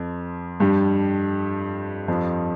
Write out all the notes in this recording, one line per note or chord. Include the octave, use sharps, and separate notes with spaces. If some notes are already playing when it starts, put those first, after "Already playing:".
Already playing: F2 F3
G2 G3
F2 F3